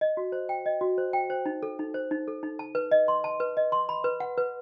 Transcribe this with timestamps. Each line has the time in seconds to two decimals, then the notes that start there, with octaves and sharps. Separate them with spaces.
0.01 D#5
0.17 F#4
0.32 C5
0.49 G5
0.66 D#5
0.81 F#4
0.98 C5
1.13 G5
1.30 C5
1.46 D#4
1.63 A4
1.79 D#4
1.94 C5
2.11 D#4
2.28 A4
2.43 D#4
2.59 A5
2.75 B4
2.91 D#5
3.08 C6
3.24 A5
3.40 B4
3.57 D#5
3.72 C6
3.89 B5
4.04 B4
4.20 F#5
4.38 B4